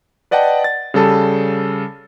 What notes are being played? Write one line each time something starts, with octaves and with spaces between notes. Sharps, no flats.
B4 D5 D#5 F#5 G5 A5
A6
C#3 G3 A4 A5